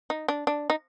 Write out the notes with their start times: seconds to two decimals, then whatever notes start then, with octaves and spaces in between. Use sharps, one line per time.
0.10 D#4
0.28 D4
0.47 D4
0.70 D#4